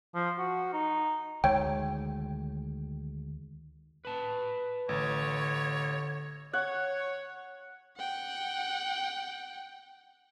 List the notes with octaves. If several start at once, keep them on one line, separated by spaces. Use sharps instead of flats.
F3
F#4
D#4
D2 D#3 G#3 C#5 G5
B4 A5
A1 D3 C#5
C#5 F#5
F#5 G5